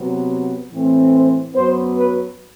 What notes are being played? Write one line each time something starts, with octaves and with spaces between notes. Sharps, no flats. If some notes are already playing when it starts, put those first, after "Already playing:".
Already playing: C3 F#3 B3
A2 E3 A3 C4
C5
F#2 F#3 B3 C5
B4